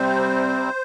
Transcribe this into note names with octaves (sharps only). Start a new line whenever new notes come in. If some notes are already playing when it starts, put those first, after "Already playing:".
Already playing: C3 G3 C4 C5